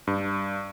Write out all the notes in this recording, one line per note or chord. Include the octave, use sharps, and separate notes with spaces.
G2